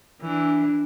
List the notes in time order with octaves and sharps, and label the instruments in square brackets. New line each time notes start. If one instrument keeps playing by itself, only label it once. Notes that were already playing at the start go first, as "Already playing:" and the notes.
[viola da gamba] E3 D4